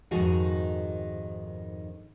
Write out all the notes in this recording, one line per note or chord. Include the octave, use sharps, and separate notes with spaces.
F2 G#2 D#3 D#4 F#4 G#4